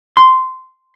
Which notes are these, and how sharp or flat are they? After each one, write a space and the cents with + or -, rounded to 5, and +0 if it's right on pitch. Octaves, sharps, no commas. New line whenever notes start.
C6 -10